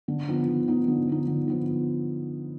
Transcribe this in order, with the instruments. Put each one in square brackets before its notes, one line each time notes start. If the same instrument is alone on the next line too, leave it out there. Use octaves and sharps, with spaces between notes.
[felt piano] D3
F3 B3 D#4
D3
F3 B3 D#4
D3
F3 B3 D#4
D3
F3 B3 D#4